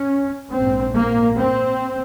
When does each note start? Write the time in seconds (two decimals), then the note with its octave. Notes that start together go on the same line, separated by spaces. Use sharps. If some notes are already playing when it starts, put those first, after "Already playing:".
Already playing: C#4
0.55 A#1 G#2 C4
0.96 A#3
1.38 C4